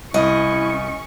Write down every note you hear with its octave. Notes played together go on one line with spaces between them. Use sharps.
C2 C#4 E4 D#5 C#6